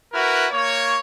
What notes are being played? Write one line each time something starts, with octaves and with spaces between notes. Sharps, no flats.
E4 F#4 A#4 B4
A#3 C#5